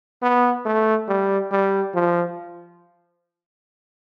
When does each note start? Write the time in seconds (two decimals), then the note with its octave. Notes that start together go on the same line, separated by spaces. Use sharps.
0.23 B3
0.66 A3
1.09 G3
1.52 G3
1.94 F3